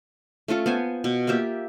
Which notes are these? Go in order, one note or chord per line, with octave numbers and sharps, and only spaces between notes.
A3 C#4 F4 A4
B3 C5 G#5
B2
A#3 F4 G4 E5